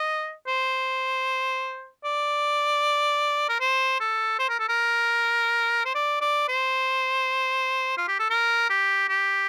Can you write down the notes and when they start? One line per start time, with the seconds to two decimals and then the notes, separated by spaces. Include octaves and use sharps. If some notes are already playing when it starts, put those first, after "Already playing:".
Already playing: D#5
0.47 C5
2.04 D5
3.49 A#4
3.60 C5
4.00 A4
4.39 C5
4.49 A#4
4.59 A4
4.69 A#4
5.85 C5
5.95 D5
6.21 D5
6.48 C5
7.97 F4
8.08 G4
8.19 A4
8.30 A#4
8.70 G4
9.09 G4